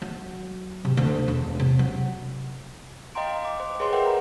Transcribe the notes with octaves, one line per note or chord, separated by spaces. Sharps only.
F#3
C3
D2
E1
C3
F#3
D#5 F5 G5 A#5 C6 D7
D#5 D6
C5
G#4 B4 C#5 D#5 C6
G#4 A#4 B4 E5 F#5 G5
A#5 B5